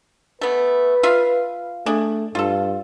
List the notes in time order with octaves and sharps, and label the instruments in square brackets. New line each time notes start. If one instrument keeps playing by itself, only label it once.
[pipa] A3 B3 [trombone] B4
[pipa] F4 E5 F5
[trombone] A3 [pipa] D4 G#4
[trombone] G2 [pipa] F4 A4